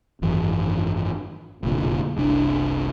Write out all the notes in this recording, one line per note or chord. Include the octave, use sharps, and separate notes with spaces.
G#1 F#2 E3 F#3
F1 B1 A#2 D3
F#1 C2 D4